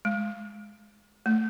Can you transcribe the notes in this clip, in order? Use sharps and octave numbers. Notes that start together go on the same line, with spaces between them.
G#3
A3